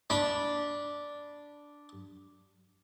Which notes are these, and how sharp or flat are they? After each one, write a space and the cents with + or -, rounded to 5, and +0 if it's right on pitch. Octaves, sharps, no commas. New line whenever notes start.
D4 -5 B5 -20